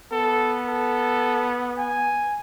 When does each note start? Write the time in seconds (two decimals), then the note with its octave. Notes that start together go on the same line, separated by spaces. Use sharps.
0.12 B3 A4
0.67 A4
1.78 G#5